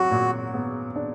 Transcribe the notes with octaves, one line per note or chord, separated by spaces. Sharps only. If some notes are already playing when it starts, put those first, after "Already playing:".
Already playing: F#3 F#4
A#2
B3
D4